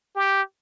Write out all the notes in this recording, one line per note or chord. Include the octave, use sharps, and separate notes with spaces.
G4